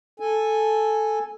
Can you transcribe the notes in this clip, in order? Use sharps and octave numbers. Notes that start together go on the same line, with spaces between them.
A4 G#5